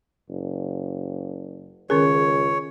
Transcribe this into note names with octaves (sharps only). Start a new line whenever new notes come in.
F#1
C#2 D#3 C#4 G#4 A#4 C#5